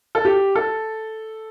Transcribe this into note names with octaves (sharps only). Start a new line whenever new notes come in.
A4
G4
A4